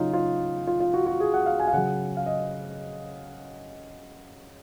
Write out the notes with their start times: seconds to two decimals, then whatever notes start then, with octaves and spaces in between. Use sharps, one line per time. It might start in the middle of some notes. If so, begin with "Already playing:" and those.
Already playing: C#3 F#3 D#4 F4
0.13 F4
0.67 F4
0.80 F4
0.94 F#4
1.06 F#4
1.20 G#4
1.34 F#5
1.46 F5
1.59 G#5
1.67 F5
1.73 C#3 F#3 F#5
2.17 F5
2.26 D#5